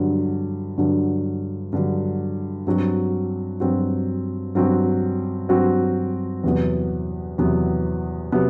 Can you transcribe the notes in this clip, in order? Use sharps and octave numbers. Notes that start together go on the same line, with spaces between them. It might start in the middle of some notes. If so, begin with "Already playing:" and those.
Already playing: G2 D3 F#3
G2 D3 F#3
G2 D3 F#3
G2 F#3 C4 F#4
G2 F#3 C4 F#4
G2 F#3 C4 F#4
G2 F#3 C4 F#4
E2 C3 F#3 B3
E2 C3 F#3 B3
C3 F#3 B3